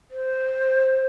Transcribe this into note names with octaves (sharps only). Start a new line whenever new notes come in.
C5